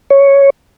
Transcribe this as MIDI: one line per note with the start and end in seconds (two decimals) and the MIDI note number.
0.10 0.50 73